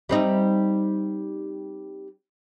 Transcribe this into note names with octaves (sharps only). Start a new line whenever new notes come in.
G3 C4 D#4